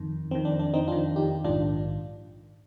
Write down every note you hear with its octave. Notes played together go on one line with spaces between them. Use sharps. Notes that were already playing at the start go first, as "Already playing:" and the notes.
Already playing: F2 D#3
F2 D#3 C4
D4
D4
C4 D#4
F2 D#3 D4 F4
D#4 G4
A#1 G#2 D#3 D4 F4